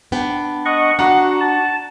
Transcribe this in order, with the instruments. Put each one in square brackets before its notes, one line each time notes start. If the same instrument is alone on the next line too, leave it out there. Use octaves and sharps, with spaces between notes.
[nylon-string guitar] B3 D4 G5
[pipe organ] D#5 F#5 C#6
[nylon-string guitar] D4 [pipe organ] F#4 [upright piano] F#5 A#5
[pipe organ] A5